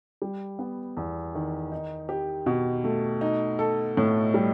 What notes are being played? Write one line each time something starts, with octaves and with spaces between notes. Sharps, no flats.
G3
B3
E2
D#3
D#4
G4
B2
A3
D#4
A4
A2
G3